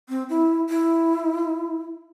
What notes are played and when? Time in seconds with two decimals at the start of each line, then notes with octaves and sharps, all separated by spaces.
0.09 C4
0.29 E4
0.69 E4